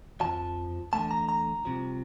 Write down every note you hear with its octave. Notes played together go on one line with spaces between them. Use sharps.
F2 C3 F3 A5
E2 D3 A3 A5
A#5
A#5
C2 C3 F3